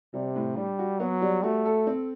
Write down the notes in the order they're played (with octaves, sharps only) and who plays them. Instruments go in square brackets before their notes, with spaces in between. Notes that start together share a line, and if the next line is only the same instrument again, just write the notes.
[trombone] C3 [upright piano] G3
[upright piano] A2
[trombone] G3 [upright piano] D4
[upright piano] F#4
[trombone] F#3 [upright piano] B3
[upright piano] G3
[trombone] A3 [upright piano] F#4
[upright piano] A4
C4